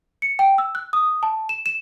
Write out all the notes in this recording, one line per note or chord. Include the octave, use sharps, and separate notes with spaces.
C#7
G5
E6
F#6
D#6
A5
E7
E7